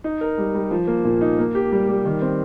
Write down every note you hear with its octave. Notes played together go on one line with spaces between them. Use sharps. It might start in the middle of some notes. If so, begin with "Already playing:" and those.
D#4
A#4
G3
G3
F3
A#3
A#2
D#4
A#3
G4
G3
G3
D#3
C4